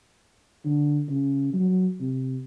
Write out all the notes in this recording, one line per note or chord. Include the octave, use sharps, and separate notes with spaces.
D3
C#3
F#3
C3